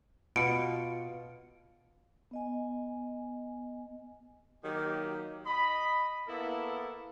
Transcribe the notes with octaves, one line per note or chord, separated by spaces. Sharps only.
B2 F4 C#7 D7
B3 D#5 G#5
D#3 F#3 A#3 G4
D#5 B5
A#3 B3 E4 A4